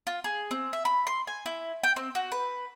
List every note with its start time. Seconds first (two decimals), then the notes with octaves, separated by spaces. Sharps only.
0.07 F4
0.24 G#4
0.51 C4
0.73 E5
0.85 B5
1.07 C6
1.27 G#5
1.46 E4
1.83 G5
1.96 C4
2.15 F#4
2.32 B4